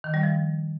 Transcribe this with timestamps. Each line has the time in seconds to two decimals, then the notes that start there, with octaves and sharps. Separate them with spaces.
0.04 D#3
0.14 G3
0.23 F3